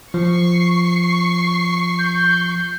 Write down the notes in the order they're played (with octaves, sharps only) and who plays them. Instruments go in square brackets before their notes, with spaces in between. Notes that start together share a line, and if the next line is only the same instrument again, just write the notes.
[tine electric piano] F3 [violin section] C#6 C7
[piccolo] G6